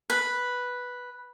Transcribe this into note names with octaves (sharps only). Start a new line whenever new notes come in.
B4